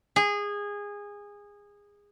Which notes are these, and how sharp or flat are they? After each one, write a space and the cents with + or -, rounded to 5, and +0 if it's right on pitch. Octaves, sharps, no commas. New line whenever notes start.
G#4 -20